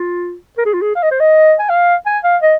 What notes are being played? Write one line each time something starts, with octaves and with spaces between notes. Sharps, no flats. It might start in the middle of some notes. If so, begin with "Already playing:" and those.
Already playing: F4
A#4
G#4
F4
G#4
F5
D#5
C5
D#5
G#5
F5
G#5
F5
D#5